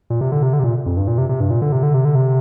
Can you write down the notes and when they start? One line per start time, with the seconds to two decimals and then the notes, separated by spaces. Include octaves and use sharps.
0.10 A#2
0.21 C3
0.32 D3
0.43 C3
0.53 D3
0.59 C3
0.64 A#2
0.86 F2
0.97 G2
1.07 A#2
1.18 C3
1.29 C3
1.40 G2
1.51 A#2
1.62 D3
1.72 C3
1.83 D3
1.94 C3
2.05 D3
2.15 C3